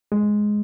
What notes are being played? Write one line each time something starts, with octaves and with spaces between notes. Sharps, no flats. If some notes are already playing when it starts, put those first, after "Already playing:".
G#3